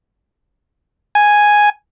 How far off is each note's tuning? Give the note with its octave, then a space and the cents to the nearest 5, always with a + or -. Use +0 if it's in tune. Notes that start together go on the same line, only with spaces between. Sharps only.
G#5 +0